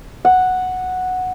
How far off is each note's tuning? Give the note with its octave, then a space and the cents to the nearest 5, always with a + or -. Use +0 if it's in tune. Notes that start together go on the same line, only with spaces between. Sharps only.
F#5 -5